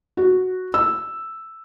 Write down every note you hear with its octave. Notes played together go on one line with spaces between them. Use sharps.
F#4
E6